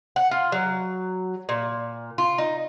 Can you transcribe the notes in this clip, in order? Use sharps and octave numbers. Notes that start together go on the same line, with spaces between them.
F#5
F4
F#3
A#2
F4
D#4